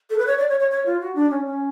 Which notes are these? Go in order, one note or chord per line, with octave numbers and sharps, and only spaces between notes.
A4
B4
C#5
D5
C#5
C#5
C#5
F4
F#4
D4
C#4
C#4